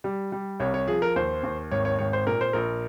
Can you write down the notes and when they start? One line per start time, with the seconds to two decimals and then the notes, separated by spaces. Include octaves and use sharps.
0.04 G3
0.32 G3
0.60 C2 C#5
0.74 C#5
0.88 F3 G#4
1.02 A#4
1.16 D#2 C5
1.43 D#2
1.71 G#1 C#5
1.85 C#5
1.99 G#1 C#5
2.13 C5
2.27 A#2 A#4
2.41 C5
2.53 A#1 A#4